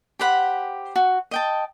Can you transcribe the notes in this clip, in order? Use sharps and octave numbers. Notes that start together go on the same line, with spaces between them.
G4 C5 F#5 B5
F#4
D#5 G5 A5